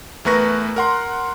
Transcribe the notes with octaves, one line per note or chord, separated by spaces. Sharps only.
E2 A3 A#4 B4 C#6 A#6
A#4 F#5 C6